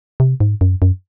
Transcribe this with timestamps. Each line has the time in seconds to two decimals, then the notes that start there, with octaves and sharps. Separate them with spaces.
0.20 C3
0.40 G#2
0.61 F#2
0.82 F#2